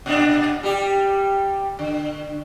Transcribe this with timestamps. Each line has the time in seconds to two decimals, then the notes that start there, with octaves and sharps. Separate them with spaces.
0.06 A#2 D4
0.63 G3 G4
1.79 D3